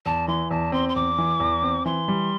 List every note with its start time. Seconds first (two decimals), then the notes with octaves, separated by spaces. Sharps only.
0.06 E2 A5
0.28 E3 C6
0.51 E2 A5
0.72 C4 C6
0.89 C6
0.95 E2 D6
1.18 E3
1.40 E2
1.62 C4
1.85 E3 C6
2.08 G3